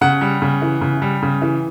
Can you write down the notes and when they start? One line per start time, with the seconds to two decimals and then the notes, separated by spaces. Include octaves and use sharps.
0.01 C#3 F#5
0.21 G3
0.42 C#3
0.62 E3
0.81 C#3
1.02 G3
1.22 C#3
1.42 E3